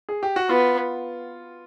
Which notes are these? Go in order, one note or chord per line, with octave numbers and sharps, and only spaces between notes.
G#4
G4
F#4
B3 F4